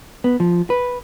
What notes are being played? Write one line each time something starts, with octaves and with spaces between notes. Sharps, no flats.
B3
F3
B4